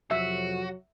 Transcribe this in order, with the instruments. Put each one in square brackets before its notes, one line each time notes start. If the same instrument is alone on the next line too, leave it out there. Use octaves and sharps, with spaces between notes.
[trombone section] F2 C3 F#3 [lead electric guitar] F#4 [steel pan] E5